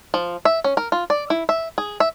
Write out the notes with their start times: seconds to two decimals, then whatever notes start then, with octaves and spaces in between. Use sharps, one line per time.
0.14 F3
0.45 E5
0.64 C#4
0.77 A#4
0.92 F4
1.10 D5
1.30 E4
1.49 E5
1.78 G#4
2.00 E5